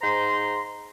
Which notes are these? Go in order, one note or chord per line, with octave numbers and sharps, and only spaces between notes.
G#2 D#4 C5 A#5 C6